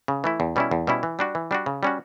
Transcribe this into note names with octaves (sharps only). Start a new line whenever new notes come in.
C#3
E3 A3 E4
E2
B2 G3 C#4 E4
E2
B2 G3 C#4 E4
E3
G3 D4 F#4
E3
G3 D4 F#4
C#3
G3 C#4 F#4